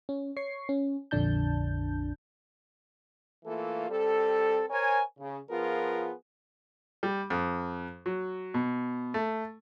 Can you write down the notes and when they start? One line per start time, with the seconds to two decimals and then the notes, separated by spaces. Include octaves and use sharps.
0.09 C#4
0.37 C#5 C#6 C7
0.69 C#4
1.11 A#1 F2 D3 D4 A5 G6
3.46 E3 A3 A#3 F4 A4
3.90 G3 C4 A4
4.70 A#4 C5 C#5 G#5
5.19 C#3
5.50 F3 B3 F4 G#4 A#4
7.03 G3
7.30 F2
8.06 F#3
8.54 B2
9.14 A3